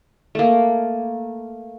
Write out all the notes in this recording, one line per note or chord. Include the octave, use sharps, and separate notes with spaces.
A3 A#3